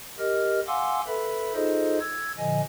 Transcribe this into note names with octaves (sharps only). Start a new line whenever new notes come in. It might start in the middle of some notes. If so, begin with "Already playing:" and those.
G4 A#4 D#5 F6
F5 F#5 G#5 C6 D6 E6
A4 B4 E5 B5
D#4 F4 G#4 A4 C5 D#5
E6 G#6
A#2 D3 F3 D#5 G#5